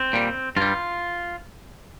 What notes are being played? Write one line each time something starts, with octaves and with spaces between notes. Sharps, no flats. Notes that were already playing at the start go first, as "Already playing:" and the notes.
Already playing: C4
A#2 G3
G2 G3 F4